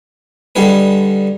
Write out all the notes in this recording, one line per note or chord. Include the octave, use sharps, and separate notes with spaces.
D3 G3 D#4 G#4 B4